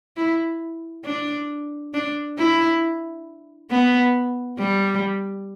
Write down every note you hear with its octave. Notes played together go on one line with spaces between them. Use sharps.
E4
D4
D4
E4
B3
G3